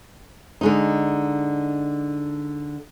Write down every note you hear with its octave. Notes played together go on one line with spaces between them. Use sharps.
D3 G#3 D#4